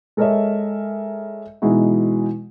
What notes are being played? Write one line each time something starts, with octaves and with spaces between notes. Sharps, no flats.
G#3 A4 A#4 C#5 D#5 E5
B2 E3 G#3 D#4 E4 F#4